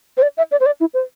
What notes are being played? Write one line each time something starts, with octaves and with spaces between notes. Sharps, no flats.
C5
D5
E5
D5
C5
D5
E4
C5